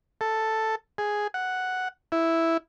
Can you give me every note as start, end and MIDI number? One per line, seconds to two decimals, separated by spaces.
0.21 0.75 69
0.98 1.27 68
1.34 1.88 78
2.12 2.57 64